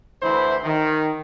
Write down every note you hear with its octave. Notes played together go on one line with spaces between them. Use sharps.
D2 E3 E4 C5
D#3